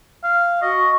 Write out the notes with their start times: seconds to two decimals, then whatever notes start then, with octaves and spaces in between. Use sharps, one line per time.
0.24 F5
0.62 F#4 D#5 C#6